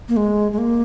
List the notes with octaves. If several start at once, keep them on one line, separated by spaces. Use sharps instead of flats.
A#3
G#3
G#3
A#3